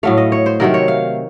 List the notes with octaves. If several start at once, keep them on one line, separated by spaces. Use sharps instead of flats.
A2 F#3 A3 F5
D#5
C#5
C5
C3 D#3 F#3 A3 A#4
C#5
F5